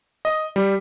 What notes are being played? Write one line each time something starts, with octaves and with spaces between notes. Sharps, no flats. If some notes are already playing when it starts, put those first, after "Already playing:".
D#5
G3